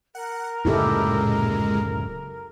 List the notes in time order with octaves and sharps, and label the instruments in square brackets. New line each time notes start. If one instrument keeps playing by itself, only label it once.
[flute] A#4 [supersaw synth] F#5
[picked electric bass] D1 F#2 C#3 [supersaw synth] A#2 G#3 [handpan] E4 G4 A4